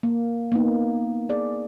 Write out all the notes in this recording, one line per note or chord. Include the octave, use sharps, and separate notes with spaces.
A#3
A#3 B3 D#4
G#4 D5